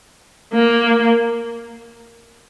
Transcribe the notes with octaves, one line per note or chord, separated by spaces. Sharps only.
A#3